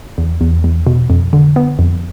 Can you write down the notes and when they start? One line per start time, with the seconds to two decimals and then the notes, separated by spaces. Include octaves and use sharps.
0.18 E2
0.41 E2
0.64 E2
0.87 B2
1.10 F2
1.33 D3
1.56 B3
1.79 F2